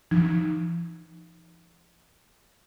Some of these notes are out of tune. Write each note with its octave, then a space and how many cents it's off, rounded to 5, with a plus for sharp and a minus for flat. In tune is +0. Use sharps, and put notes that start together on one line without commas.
F3 -40 D#4 +0